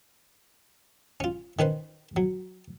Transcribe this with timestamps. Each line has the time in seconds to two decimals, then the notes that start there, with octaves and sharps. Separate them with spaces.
1.20 C#4 F4
1.59 D#3 C#4 B4 C5
2.16 F#3